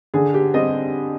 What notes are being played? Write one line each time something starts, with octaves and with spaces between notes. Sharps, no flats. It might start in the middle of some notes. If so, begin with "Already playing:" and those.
D3 G#4
G4
G3 C4 D#5